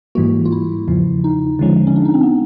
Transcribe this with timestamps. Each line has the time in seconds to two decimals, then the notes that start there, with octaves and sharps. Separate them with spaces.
0.15 G#2 E3 G3 A#3 F#4
0.45 F4
0.52 E4
0.88 E2 C#3 F3
1.24 D#4
1.59 D3 F3 G#3 C#4
1.87 C#4
1.96 D4
2.05 D#4
2.14 C4
2.23 B3